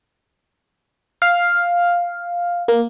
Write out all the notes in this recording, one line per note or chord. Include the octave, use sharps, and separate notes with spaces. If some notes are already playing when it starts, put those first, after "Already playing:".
F5
A#3